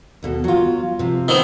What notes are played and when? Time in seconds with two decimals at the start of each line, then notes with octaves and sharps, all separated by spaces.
0.23 D#2 B2 A4
0.44 F#3 F4
0.99 C3 F3
1.28 D#3 B3 C4